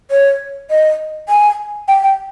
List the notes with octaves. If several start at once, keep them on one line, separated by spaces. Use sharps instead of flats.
C#5
D#5
G#5
G5
G5